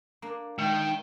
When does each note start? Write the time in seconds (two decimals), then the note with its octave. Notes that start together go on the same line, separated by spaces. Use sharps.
0.22 A#3 D4
0.59 D#3 G#3 G5